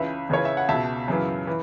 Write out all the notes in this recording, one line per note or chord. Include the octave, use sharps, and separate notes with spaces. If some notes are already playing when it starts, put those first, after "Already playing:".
Already playing: C#2 C#3 E3 B4 E5
C#2 C#3 E3 C#5
E5
F#5
C#2 B2 E5 A5
F#2 C#3 E3
E3